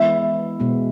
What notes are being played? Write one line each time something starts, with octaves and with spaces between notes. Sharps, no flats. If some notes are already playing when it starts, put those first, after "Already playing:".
Already playing: E3 G#3 B3 E4 E5
B2 G#3 B3